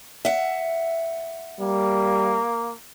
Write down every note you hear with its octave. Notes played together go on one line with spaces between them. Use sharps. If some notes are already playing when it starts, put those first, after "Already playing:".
E5 F#5
G3 A#3